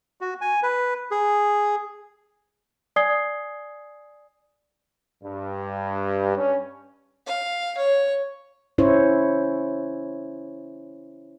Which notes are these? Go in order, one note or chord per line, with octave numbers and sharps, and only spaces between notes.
F#4
G#5
B4
G#4
D5 G#5 D#6 G#6 C7 G7
G2
C#4
F5
C#5
C#4 E4 C5 C#5